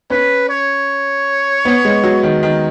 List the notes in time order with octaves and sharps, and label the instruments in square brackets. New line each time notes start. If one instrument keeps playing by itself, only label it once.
[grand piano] C#4 [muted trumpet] B4
[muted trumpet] C#5
[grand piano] B3
G#3
F#3
D#3
D#3